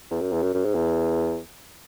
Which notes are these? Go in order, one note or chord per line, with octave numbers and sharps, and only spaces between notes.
E2
F#2
E2
F#2
F#2
G#2
E2